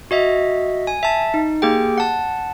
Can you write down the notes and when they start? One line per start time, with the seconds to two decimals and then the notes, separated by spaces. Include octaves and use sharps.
0.11 F#4 D#5 E5
0.87 G#5
1.03 E5 A5
1.34 D#4
1.62 A#3 G4 G#4 G5
1.98 F#5 A5